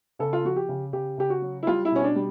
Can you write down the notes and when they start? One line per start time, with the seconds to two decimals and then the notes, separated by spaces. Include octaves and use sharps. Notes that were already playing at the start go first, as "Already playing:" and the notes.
0.19 C#3 A4
0.33 F4
0.44 F3 F#4
0.56 G4
0.69 C#3
0.93 C#3 G4
1.18 C#3 G4
1.30 F#4
1.42 F#3
1.63 E4
1.67 G3 F4
1.85 E4
1.91 B2 C#4
2.04 D4
2.16 G3